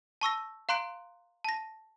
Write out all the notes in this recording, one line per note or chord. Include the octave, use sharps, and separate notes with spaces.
A5 C#6 E6 A#6
F5 A#5 C6 F#6 D7
A5 A#6